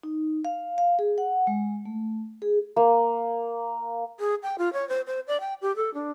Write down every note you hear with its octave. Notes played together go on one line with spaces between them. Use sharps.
D#4
F5
F5
G#4
F#5
G#3
A3
G#4
A#3
G#4
G5
F4
C#5
C5
C5
D5
G5
G4
A4
D4